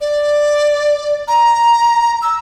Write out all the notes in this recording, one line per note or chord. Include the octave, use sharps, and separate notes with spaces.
D5
A#5
E6